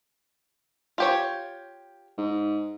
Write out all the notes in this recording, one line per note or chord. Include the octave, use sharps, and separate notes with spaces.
F4 G4 C#5
G#2